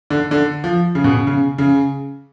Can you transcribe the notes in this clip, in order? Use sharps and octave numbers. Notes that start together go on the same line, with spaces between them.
D3
D3
F3
C#3
B2
C#3
C#3
C#3